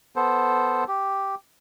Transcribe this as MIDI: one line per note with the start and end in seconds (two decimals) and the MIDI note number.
0.16 0.84 59
0.16 0.84 69
0.16 0.84 72
0.88 1.35 67